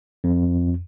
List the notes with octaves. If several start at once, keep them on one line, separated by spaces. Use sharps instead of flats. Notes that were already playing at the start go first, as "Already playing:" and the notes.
F2